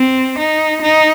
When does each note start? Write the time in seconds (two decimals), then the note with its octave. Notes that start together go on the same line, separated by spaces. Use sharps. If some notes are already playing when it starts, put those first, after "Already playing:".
Already playing: C4
0.38 D#4
0.81 D#4